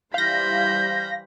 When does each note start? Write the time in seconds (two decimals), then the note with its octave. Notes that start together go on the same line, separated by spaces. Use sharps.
0.14 E3 G3 C5 F5 B5 G6 A#6